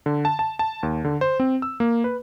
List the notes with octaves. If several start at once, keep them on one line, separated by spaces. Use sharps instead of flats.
D3
A5
A5
A5
D#2
D3
C5
C4
E6
A#3
B4